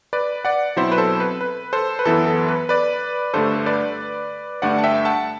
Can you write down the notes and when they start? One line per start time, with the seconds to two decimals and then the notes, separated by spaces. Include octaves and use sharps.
0.13 B4 D5
0.45 D5 F#5
0.76 B2 F#3 C4 E4 C5 E5
0.92 B4
0.98 A4 C5
1.20 B4
1.41 B4
1.73 A4 C5
1.99 B4
2.05 F#2 E3 B3 E4 A4
2.27 A4
2.48 B4
2.69 B4 D5
3.34 G2 D3 A3 A4 C5
3.66 B4 D5
4.62 G2 D3 A3 D5 F#5
4.78 A5
4.84 E5 G5
5.05 F#5 A5